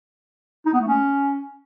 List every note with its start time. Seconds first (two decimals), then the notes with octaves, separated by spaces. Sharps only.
0.66 D#4
0.73 B3
0.80 A3
0.88 C#4